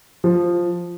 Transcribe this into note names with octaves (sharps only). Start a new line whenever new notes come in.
F3